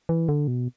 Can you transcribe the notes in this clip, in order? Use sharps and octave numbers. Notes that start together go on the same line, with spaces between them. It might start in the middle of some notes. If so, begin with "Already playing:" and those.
E3
D3
B2